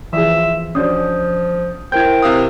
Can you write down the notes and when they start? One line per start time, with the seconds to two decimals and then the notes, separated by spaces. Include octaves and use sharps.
0.13 E3 F3 G#4 E5
0.37 F4
0.75 F3 C#4 D4 F#4 D#6 G6
1.92 E4 A#4 C5 G5 G6 G#6
2.22 C3 F5 D#6